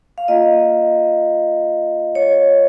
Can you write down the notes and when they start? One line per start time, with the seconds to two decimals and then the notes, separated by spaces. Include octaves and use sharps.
0.18 F5
0.28 A#3 F4 D#5
2.15 C#5